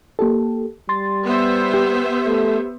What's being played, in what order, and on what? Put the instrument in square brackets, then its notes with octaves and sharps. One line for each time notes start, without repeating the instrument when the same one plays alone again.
[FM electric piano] A#3 G4 A4
[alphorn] G3 [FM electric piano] C6 A6
[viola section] B3 C5 E5
[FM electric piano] G4
[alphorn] A3